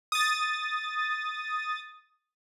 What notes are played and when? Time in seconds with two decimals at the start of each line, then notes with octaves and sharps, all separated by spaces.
0.12 D#6 A6